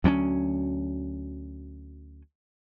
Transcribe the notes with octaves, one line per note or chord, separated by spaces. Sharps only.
D2 F#3 A3 C#4